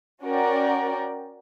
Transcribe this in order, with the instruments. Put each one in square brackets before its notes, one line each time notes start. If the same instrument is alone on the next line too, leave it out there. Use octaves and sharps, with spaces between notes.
[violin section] C#4 F#4 A#4 D5 G5